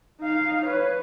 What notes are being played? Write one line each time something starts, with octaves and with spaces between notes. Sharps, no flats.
D#4 F5
B4 C#5